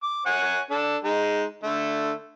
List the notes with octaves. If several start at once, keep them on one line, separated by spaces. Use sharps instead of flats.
D6
C#5 F#5 G#5
D4 A4
G#3 D#4
D3 A3